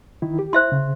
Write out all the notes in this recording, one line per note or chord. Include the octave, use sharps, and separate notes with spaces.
D#3 E4
G4
E4 C5 E5 C6
C#3